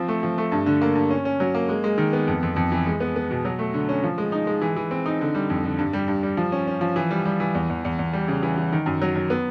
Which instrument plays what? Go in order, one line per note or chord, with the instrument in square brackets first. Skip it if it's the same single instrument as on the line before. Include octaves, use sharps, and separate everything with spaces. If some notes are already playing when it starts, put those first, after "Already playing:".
Already playing: [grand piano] F3 C4
A3
F3
A3
G2
D3
A#3
G2
C#4
C#4
F#3
A#3
G#3
G#3
D#3
B3
F2
F2
F2
E3
G#3
B3
B3
B2
F#3
A3
D3
C#4
F3
G#3
D#4
G#3
E3
E3
C4
D#4
D3
G3
F2
D3
G2
G3
G2
G3
F3
C#4
C#4
F3
E3
G3
G3
E3
E2
E2
E2
E2
G3
C#3
E3
E3
D#3
F#2
F#3
F#3
B3